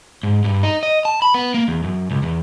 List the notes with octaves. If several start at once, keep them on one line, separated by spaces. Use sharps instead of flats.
G#2
G2
D#4
D#5
A5
B5
B3
A#3
E2
F#2
C#2
E2